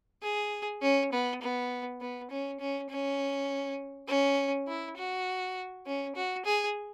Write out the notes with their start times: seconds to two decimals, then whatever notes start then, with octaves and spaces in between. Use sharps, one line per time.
0.23 G#4
0.82 C#4
1.12 B3
1.42 B3
2.01 B3
2.30 C#4
2.60 C#4
2.90 C#4
4.08 C#4
4.68 E4
4.97 F#4
5.86 C#4
6.16 F#4
6.45 G#4